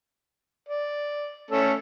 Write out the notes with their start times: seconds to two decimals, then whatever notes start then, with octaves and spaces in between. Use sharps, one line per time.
0.68 D5
1.51 A3 C#4 A4